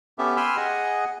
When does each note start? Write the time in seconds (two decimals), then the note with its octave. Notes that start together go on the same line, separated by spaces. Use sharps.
0.18 B3 C#4 G4 A4 E5
0.37 G5 G#5 B5 C6 E6 F6
0.57 G#4 D#5 F#5 G#5